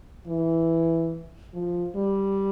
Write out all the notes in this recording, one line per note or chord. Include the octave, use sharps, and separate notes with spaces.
E3
F3
G3